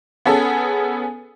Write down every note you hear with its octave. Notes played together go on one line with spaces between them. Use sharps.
B3 C#4 G#4 A4